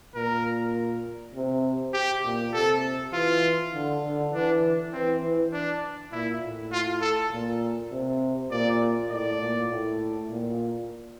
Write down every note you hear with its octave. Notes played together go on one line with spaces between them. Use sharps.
A#2 A#4
C3
G4
A#2
C3 A4
E3 F4
D3
D3
E3 D4
E3 C4
E3
D4
A#2 E4
A2
F4
A4
A#2
C3
A#2 D5
A2 D5
A#2
A2
A#2